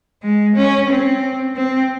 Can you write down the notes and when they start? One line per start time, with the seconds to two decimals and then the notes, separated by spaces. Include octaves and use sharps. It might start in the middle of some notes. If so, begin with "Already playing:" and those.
0.24 G#3
0.56 C#4
0.90 C4
1.57 C4